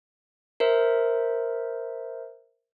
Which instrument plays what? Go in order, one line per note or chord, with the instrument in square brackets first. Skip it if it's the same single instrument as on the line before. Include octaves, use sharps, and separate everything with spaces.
[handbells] A#4 C5 E5